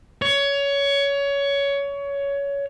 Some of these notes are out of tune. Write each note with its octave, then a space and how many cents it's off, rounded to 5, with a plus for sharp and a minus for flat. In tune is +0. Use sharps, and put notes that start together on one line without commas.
C#5 +20